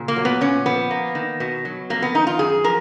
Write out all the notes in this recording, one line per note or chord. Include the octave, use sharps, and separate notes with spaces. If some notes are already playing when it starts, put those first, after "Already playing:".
Already playing: A#2 C#3
A#3
F#3
B3
A#2 C#4
F3 B3
A#3
D#3
B2
F#3
F2 A#3
B3
D#3 D#4
F4
F#2 G#4
F3 A#4